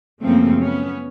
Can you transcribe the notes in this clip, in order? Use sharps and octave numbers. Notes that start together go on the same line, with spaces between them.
F#2 C#3 F3 A3 A#3 C4
B3 C#4